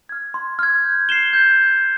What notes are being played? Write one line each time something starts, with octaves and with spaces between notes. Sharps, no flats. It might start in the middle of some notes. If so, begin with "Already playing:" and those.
F6 G#6
C6
F6 G#6
G6
C7 E7 G7
G6